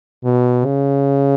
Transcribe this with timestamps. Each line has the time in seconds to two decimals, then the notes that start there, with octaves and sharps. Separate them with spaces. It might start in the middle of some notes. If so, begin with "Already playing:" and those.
0.24 B2
0.65 C#3